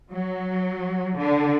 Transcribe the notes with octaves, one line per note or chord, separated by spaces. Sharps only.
F#3
D3